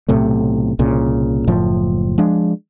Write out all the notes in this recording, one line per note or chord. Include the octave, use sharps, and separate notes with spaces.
B1 A2 C3 A3
C2 A#2 C#3
F#1 A2 F3
F3 G#3 D4